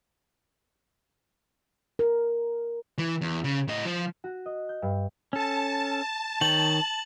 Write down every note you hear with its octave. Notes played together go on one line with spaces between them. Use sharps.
A#4
E3
E2
C#3
A2 D#5
F3
F#4
D#5
G6
G2
C#4 A4 A5
D#3 C#5 G5 F#7